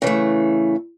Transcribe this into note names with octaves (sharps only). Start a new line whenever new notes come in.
C#3 E3 A3